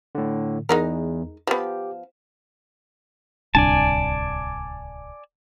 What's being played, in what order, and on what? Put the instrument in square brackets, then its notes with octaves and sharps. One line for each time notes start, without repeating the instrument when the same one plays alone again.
[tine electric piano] A2 D3
[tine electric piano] E2 [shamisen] G#3 D#4 A#4
[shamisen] F3 B3 [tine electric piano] G4
[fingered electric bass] D1 C2 D4 [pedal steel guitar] D5 G#5 A5